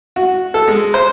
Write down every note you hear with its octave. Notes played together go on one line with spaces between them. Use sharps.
F#4
A4
G#3
C5